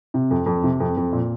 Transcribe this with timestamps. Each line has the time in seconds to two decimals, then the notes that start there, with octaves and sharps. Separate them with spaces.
0.14 C3
0.31 F2
0.46 F2
0.64 C3
0.80 F2
0.97 F2
1.13 A#2